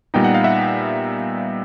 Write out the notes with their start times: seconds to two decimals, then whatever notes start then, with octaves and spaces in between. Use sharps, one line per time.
0.14 A#2 G3 B3 D#4 G5
0.24 F#5
0.34 F5
0.44 E5 F#5